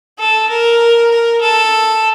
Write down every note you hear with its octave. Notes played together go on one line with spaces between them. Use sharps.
A4
A#4
A#4
A4